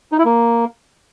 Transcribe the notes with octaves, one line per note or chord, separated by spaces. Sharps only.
D#4
E4
A#3